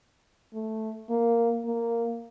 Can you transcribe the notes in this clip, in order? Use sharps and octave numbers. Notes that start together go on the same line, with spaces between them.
A3
A#3
A#3